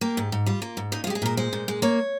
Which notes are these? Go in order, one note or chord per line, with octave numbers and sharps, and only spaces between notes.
A#3 G4
G#2
G#2
G3 F4
A#3
G#2
A#2 D#4
F4
G#3 G4
G#4
A#2 A#4
G#3 C5
A#2
G#3
A#3 C#5